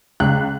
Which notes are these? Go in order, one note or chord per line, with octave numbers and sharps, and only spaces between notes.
C#2 F#6